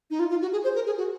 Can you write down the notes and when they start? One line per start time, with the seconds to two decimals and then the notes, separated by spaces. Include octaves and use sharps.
0.10 D#4
0.20 F4
0.30 F4
0.42 F#4
0.52 G#4
0.64 C5
0.75 A#4
0.86 G#4
0.98 F#4